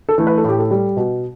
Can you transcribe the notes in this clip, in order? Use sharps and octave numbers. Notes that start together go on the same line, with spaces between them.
A4
E3 A3
B4
A4
A2 G4
A4
G3
B2